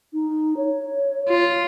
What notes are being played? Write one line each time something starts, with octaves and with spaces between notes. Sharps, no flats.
D#4
C#5
F4